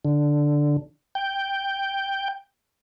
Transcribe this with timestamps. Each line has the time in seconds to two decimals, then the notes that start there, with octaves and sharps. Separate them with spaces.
0.05 D3
1.15 G5